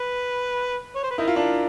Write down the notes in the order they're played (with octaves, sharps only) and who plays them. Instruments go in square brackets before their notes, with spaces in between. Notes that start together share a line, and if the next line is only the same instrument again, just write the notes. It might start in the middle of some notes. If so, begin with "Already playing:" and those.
Already playing: [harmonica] B4
C#5
C5
B4
[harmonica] D#4 A#4 [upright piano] E4
[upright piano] F4
D4 E4